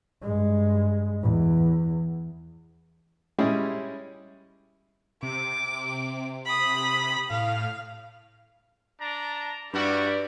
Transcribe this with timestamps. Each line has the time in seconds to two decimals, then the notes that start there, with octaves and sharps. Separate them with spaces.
0.22 G2 G#3
1.22 E2
3.38 G3 G#3 C#4 E4 G#4
5.23 C3 D6
6.45 B5 D#6
7.30 A2 F5
9.01 D4 A5 A#5
9.73 G2 G3 E4 F#4 B4 D5